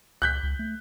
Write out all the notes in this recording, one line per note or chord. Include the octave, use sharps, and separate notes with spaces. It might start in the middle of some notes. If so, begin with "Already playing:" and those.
C#2 F#6 G6 B6
C#2
A3